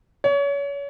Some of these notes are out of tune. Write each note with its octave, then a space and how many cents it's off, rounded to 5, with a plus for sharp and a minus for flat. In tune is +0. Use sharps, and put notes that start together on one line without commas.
C#5 +30